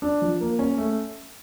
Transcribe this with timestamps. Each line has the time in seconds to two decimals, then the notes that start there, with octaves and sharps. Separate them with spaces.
0.02 D4
0.22 F3
0.41 A#3
0.59 C#4
0.78 A3